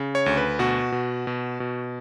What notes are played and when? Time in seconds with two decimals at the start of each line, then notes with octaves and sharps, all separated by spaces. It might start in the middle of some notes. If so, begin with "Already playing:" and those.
Already playing: C#3
0.15 C#5
0.26 D2
0.37 B4
0.59 B2 F#4
0.92 B2
1.27 B2
1.60 B2